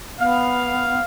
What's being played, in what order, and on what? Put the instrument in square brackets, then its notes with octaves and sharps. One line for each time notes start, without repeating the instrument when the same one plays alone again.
[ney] B3 [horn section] F5